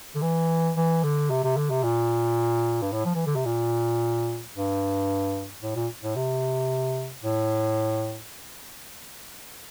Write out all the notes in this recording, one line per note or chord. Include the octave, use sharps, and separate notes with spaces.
D3
E3
E3
D3
C3
C3
D3
C3
A#2
G2
A2
F3
E3
D3
C3
A#2
G2
A2
A#2
A2
C3
A2